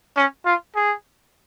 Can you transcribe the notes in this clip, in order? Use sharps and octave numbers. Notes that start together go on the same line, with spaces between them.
C#4
F4
G#4